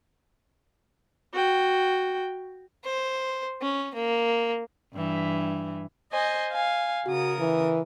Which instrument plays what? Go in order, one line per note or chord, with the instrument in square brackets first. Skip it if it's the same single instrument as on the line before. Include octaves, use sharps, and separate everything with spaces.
[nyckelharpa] F#4 G5
[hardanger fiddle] C5
C#4
A#3
[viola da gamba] G2 E3
[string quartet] C5 D#5 G#5
F5 G#5
[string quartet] C#3 A#4 D#6 [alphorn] F#4
[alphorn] E3